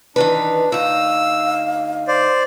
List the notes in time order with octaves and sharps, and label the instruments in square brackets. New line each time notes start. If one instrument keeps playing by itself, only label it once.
[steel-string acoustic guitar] D#3 E3 B4 [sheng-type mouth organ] D4
[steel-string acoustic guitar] D2 D#4 [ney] F5 [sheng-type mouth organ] E6
[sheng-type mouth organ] C5 D5